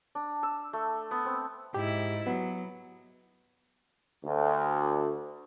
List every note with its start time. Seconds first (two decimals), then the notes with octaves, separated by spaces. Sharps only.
0.15 D4
0.43 E6
0.73 A3
1.11 B3
1.25 C4
1.74 G#2 E4 G4
2.27 F#3 B3
4.25 D2